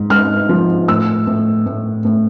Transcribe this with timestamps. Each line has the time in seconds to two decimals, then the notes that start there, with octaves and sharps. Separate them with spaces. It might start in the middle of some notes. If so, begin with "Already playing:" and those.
Already playing: G#2
0.10 G#2 F6
0.49 F3
0.88 A2 E6
1.27 A2
1.66 A2
2.05 A2